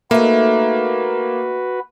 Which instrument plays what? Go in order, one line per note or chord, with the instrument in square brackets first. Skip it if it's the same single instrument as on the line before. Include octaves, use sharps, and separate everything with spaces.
[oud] A3 D#4 [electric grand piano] A#3 [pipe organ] F#4 B4